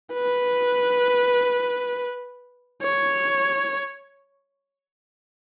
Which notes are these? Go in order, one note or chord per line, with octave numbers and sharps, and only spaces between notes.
B4
C#5